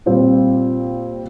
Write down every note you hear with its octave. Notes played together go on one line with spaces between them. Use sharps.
A#2 G3 C4